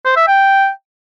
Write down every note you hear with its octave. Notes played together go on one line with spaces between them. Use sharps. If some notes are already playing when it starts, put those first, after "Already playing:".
C5
E5
G5